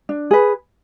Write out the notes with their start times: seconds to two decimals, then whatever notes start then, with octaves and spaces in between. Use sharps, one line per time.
0.09 D4
0.31 G#4 B4